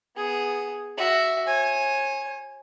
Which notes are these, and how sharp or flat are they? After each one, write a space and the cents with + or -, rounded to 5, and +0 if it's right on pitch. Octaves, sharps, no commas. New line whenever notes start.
B3 +0 G#4 +0
F#4 +10 E5 +0
C#5 -40 G#5 +0